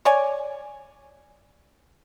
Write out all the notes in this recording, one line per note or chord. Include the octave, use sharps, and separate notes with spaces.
C#5 D5 G#5